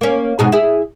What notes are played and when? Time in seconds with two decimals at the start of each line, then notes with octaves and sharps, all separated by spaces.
0.01 A#3 C#4
0.39 G#2 B2 G#4
0.52 E4 G#4